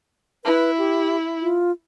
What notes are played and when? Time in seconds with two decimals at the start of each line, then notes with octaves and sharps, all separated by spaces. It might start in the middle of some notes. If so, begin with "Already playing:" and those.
0.45 E4 B4
0.78 G4
1.41 F4